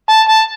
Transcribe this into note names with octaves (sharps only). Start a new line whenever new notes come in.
A5
A5